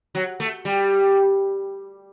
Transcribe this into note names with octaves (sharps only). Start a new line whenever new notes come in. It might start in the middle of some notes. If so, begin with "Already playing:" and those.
F#3
A3
G3